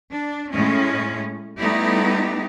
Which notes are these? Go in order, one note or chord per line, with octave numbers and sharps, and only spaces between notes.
D4
A2 G#3 C#4
G3 A3 B3 D#4 E4 G4